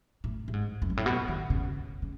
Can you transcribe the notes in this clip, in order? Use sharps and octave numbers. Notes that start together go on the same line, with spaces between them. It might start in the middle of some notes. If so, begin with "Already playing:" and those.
A2
A2
G#2
F#2
G#2
A2
B2
D#3
C#3
C#3